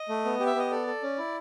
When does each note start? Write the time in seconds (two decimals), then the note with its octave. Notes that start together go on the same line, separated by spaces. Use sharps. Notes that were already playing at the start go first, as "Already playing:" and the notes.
Already playing: D#5
0.09 A3
0.25 B3
0.40 G4
0.46 E5
0.56 B3 D#5
0.71 A4 D5
0.87 A4
1.03 C#4
1.18 E4